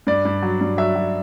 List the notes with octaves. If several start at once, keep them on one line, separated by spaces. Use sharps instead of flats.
G2 D5
G2
F#3
G2
F#3 E5
F#3